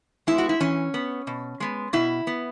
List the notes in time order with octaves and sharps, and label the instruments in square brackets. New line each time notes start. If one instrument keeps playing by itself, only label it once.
[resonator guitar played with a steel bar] G#3 B3 E4
F#4
E4
E3 C#4
B3
B2
G#3 B3
B2 E4
B3